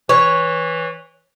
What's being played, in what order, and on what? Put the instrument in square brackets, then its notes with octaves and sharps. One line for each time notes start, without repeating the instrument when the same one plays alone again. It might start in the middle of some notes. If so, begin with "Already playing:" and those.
[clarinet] E3 [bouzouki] C#5